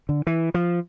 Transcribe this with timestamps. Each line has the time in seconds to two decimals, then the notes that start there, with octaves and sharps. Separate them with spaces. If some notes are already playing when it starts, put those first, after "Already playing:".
0.09 D3
0.27 E3
0.54 F3